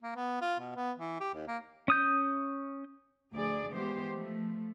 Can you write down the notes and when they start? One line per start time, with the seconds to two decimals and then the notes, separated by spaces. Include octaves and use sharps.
0.02 A#3
0.16 B3
0.42 F4
0.60 B2
0.76 B3
0.98 E3
1.20 G4
1.35 D#2
1.48 A#3
1.88 C#4 D#6 G6
3.34 D2 F3 G#4 D5
3.72 E3 G#3 B3 G4 C5
4.15 F3 A3